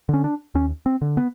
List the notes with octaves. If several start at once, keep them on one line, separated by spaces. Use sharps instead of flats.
D3 C#4
D4
D#2 C#4
C4
D3
B3